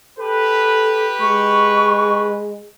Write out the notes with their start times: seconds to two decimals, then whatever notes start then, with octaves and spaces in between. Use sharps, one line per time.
0.19 G4 A4 B4
1.20 G#3 C#6